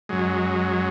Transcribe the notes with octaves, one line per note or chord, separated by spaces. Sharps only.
F#2 F#3 G#3